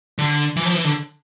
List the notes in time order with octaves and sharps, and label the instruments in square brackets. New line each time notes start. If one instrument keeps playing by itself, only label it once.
[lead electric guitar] D3
E3
F3
E3
D3